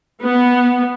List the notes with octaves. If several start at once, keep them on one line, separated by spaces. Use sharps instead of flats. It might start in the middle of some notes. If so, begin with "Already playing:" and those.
B3